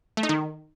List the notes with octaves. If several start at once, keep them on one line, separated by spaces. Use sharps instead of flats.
A3
D#4
D#3